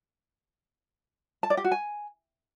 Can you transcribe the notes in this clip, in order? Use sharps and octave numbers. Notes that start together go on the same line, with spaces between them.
A5
D5
G4
F#4
G#5